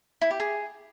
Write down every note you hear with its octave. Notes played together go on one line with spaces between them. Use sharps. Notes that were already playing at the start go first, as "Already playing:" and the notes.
E4
G4
G#4